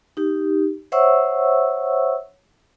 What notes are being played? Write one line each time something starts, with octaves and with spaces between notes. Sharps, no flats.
D#4 G4
C5 C#5 E5 F#5 C#6 E6